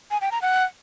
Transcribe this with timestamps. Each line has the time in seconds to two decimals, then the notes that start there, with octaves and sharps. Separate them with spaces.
0.11 G#5
0.21 G5
0.32 A#5
0.42 F#5